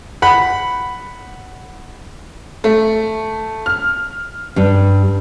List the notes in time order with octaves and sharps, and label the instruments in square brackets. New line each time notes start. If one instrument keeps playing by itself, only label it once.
[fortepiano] F#5 B5
[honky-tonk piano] A3
F6
[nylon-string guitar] G2 G3 D4